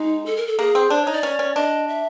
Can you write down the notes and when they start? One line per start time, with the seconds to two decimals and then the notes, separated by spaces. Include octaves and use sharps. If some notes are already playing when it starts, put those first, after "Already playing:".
Already playing: G#3 D#4
0.26 A4
0.36 A#4
0.47 A4
0.59 A#3 G#4
0.75 C4
0.90 D4 C5
1.01 C#5
1.07 D#4
1.13 D5
1.23 C#4
1.39 C#4
1.56 D4 D#5
1.88 E5